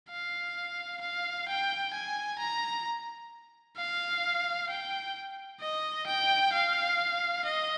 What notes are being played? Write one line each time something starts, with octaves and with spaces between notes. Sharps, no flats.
F5
F5
G5
G#5
A#5
F5
G5
D#5
G5
F5
D#5